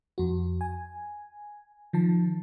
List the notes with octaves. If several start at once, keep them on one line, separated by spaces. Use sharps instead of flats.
F2 F#4
G#5
D#3 F3 A5